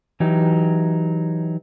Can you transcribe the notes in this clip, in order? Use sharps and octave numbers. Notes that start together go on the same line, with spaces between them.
E3 F#3 D#4 G4